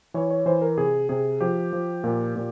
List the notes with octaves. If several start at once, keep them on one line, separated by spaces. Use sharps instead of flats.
E3 C#5
C#5
E3 C5
A#4
C3 G#4
C3 G#4
F3 G4
F3
A#2
A#2